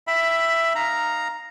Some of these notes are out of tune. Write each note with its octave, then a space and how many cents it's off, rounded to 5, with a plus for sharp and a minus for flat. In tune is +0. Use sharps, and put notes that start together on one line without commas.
E5 +10 G5 +0 B5 +0
D#4 -10 F5 +0 A#5 +0